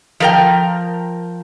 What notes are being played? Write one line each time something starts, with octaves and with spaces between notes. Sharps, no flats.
F3 A#4 G5